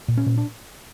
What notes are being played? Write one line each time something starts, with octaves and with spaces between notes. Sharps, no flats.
A#2
C#4
A#2
D4